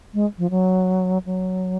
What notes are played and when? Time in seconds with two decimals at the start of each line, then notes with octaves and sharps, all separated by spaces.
0.14 G#3
0.38 F3
0.50 F#3
1.26 F#3